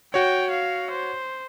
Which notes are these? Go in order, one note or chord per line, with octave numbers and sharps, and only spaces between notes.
F#4 C#5 G5
F5
C5